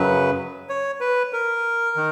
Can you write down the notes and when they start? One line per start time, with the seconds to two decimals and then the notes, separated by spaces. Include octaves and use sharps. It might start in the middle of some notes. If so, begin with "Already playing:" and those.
Already playing: F#2 C#3 F#3 B4
0.69 C#5
1.01 B4
1.33 A#4
1.96 D#3